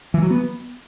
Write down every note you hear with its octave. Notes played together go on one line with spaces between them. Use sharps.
E3
F#3
B3